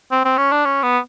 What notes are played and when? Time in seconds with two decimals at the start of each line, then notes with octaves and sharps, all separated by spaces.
0.11 C4
0.25 C4
0.38 C#4
0.52 D4
0.65 C#4
0.83 B3